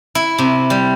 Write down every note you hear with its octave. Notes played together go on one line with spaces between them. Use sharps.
E4
C3
G3